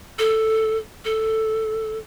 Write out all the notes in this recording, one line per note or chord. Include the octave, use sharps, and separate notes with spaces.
A4
A4